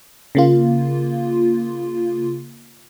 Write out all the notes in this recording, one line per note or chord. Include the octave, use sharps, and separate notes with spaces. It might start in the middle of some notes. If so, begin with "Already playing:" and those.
C#3 A#3 F4